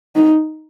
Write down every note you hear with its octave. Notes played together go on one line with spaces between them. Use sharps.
D#4